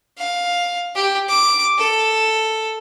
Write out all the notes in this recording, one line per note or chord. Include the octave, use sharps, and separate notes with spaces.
F5
G4
D6
A4